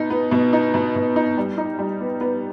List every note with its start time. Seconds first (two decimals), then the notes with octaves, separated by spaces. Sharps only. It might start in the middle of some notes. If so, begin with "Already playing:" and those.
Already playing: B2 D#4
0.10 B3
0.31 B2
0.53 D#4
0.74 B2
0.95 B2
1.16 D#4
1.38 G3
1.58 D#4
1.79 G3
2.01 B3
2.21 B3